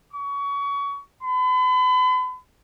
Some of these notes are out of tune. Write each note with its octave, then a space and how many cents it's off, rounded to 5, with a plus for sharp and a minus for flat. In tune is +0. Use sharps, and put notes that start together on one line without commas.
C#6 +30
B5 +40